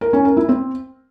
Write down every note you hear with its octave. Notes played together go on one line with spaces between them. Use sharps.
A#4
C#4
A#4
E4
C4